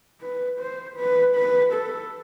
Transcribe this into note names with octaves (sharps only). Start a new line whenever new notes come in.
B4
C5
B4
B4
A4